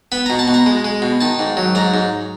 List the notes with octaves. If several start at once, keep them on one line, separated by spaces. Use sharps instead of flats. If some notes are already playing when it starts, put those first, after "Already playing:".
B3 B5
B2 A#5
A5
B2
A#5
G#3
G#3
B2
D#3 A5
G#2
F#3
G#2 A#5
G#2